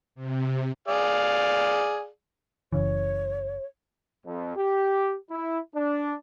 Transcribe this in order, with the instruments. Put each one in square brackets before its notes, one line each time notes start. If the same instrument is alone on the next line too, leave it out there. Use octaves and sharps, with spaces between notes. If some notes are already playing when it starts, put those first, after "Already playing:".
[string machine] C3
[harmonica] G#4 D5 F5
[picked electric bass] F#1 C#3 E3 [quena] C#5
[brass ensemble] F2
G4
E4
D4